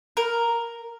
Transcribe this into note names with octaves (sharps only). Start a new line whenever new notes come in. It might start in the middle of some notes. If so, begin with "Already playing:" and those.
A#4